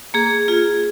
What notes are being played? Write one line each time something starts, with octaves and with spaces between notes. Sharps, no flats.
A#3 G#4
F4 G#4